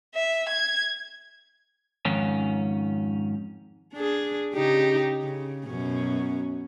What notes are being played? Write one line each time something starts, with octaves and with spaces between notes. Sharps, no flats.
E5
G#6
F2 G#2 D#3 C#4
D4 G#4
C#3 D#4 G4
C#3
F#2 B2 C#4